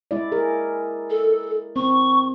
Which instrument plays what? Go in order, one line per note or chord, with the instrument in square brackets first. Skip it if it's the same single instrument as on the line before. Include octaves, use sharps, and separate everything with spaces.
[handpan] G#3 E4 D5
G#4 A#4
[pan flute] A4
[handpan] C4 [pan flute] C#6